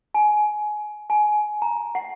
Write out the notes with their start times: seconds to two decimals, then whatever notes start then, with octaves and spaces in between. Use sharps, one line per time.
0.14 G#5
1.10 G#5
1.62 A#5
1.95 F#5